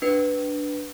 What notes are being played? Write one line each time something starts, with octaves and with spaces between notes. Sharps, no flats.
D4 B4